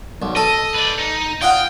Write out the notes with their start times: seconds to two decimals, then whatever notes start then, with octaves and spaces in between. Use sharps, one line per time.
0.22 B1
0.36 A4 D#5
0.74 B4 D5
0.99 D#4
1.42 F4 D#5 F#5 G5